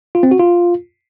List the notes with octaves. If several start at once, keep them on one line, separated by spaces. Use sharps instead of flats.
F4
C4
F#4
F4